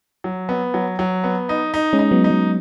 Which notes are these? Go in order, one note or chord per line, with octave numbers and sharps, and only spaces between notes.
F#3
B3
F#3
F#3
B3
D#4
D#4
G#3 C#4
D#4
F#3 B3
D#4
F#3